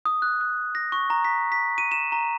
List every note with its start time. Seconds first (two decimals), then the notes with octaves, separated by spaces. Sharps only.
0.05 D#6
0.22 F#6
0.41 F#6
0.75 A#6
0.92 C#6
1.10 A#5
1.25 B6
1.52 B6
1.78 D#7
1.92 E7
2.12 A#5